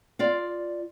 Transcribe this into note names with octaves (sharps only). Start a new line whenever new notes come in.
F4 D5 F5